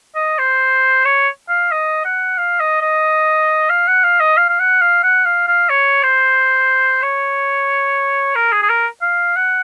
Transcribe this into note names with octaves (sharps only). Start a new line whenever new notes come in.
D#5
C5
C#5
F5
D#5
F#5
F5
D#5
D#5
F5
F#5
F5
D#5
F5
F5
F#5
F5
F#5
F5
F5
C#5
C5
C#5
A#4
G#4
G#4
A#4
F5
F#5